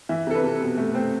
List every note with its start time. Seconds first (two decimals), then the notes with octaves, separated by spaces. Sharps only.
0.09 E3 E5
0.27 C3 A4
0.35 B4
0.43 C3
0.61 B2
0.78 A3
0.95 C4